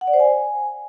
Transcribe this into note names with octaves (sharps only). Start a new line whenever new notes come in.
F#5
D5
C5
G#5